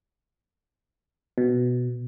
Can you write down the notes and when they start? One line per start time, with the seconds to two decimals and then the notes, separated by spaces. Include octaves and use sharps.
1.38 B2